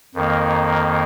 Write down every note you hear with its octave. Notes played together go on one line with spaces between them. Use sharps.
F2 D#3 A#3